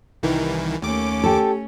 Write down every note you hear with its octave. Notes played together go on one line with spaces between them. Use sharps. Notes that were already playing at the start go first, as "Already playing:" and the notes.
C2 D#3 E3
D#2 A3 C#4 D6
G4 A4